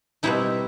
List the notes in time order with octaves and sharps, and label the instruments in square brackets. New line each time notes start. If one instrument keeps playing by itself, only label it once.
[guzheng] B2 G3 C4 D#4 E4